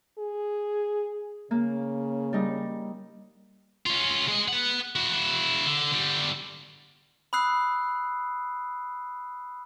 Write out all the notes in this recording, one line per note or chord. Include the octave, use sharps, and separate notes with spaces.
G#4
C#3 A#3
G3 D#4
C#4 F4
G#3 D#5
B4 F#5
E4 F#4
D3
D3 G3
B5 D#6 E6 F#6 C7